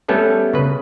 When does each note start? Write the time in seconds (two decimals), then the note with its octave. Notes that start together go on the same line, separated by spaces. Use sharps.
0.09 G3 A3 B3 C#4 A4
0.54 C#3 B4